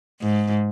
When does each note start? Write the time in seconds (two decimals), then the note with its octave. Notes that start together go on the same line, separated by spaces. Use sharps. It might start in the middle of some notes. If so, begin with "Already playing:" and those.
0.21 G#2